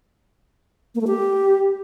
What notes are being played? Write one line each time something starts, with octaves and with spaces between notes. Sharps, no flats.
A#3
A3
G4